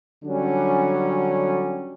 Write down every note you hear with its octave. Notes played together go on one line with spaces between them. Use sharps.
D3 F#3 G3 C#4 D4